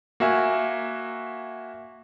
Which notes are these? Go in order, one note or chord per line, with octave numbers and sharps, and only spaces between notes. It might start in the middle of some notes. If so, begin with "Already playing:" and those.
A#3 F#4 E5 G#5